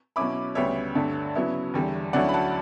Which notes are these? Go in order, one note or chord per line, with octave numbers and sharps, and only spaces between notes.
B2 F#3 C#4 E4 B5 D6
D2 C#3 G3 B3 C#5 E5
G2 D3 A3 D4
C#3 F#3 B3 E4
E2 D3 G3
D2 D3 F#3 C#4 E4 D5 F#5
B5
F#5 A5